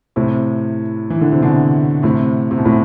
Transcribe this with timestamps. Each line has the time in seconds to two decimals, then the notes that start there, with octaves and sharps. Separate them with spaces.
0.16 A2 C3
1.10 E3
1.21 D3
1.32 C3
1.42 B2 D3
2.03 A2 C3
2.51 C3
2.58 B2
2.65 A2